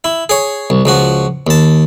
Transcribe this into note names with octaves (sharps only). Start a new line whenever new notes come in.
E4
G#4 C#5
C2
C#2 F3 F#4
D#2 A5